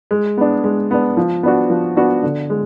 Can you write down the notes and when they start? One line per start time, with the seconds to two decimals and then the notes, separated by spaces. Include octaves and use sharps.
0.11 G#3
0.37 B3 D4
0.64 G#3
0.91 B3 D4
1.17 F3
1.43 B3 D4 F#4
1.70 F3
1.97 B3 D4 F#4
2.23 D3
2.50 G#3